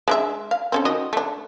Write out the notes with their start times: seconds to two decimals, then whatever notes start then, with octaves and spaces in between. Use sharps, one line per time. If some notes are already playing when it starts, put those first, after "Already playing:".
0.08 G#3 D4 E5
0.51 F5
0.72 C4 C#4 A4
0.85 D#3 F#4 D#5
1.13 A3 D4